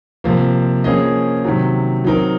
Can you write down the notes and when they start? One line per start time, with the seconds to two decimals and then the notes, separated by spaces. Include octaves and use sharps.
0.24 C3 F3 A#3
0.84 F3 A#3 C#4 G#4 D#5
1.44 C3 D#3 F#3
2.05 F#3 C4 D#4 A#4